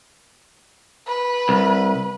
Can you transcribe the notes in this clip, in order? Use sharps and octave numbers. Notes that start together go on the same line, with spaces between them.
B4
C2